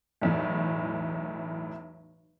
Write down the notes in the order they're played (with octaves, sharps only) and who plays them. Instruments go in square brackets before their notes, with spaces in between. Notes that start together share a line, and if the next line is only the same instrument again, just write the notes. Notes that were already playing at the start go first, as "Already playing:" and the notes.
[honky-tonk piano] B1 E2 A2